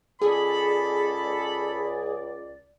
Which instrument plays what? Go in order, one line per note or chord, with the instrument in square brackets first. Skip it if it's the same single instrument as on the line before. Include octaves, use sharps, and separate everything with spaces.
[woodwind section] C#2 D5 [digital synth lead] G#4 [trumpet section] A4 B5